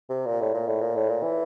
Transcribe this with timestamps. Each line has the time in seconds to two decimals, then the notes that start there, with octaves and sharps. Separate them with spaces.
0.09 C3
0.27 A#2
0.41 A2
0.54 A#2
0.68 A2
0.82 A#2
0.96 A2
1.09 A#2
1.23 E3